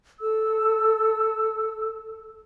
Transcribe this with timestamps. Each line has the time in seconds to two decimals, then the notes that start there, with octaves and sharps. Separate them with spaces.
0.19 A4 E6